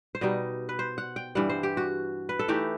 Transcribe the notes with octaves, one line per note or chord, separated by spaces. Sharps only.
C5
B2 G3 D#4 D#5
B4
C5
F#5
G5
G2 E3 G3 F#5
C5
G4
F#4
B4
A4
E3 A3 D#4 G4